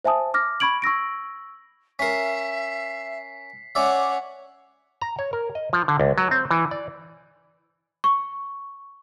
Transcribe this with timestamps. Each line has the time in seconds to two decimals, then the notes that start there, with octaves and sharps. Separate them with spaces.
0.05 C5 E5 G#5 A5 D#6
0.34 D6 F6 A#6
0.60 B5 C#6 G#6 D7 F#7
0.82 C#6 E6 A#6 D7
1.99 C#4 A#4 E5 B6 C7
3.75 C#4 C#5 D5 E5 F#5 D6
5.02 A#5
5.19 C#5
5.33 A#4
5.55 D#5
5.73 F3
5.88 D3
6.00 C#2
6.18 F#3
6.31 C4
6.51 E3
6.71 D5
8.04 C#6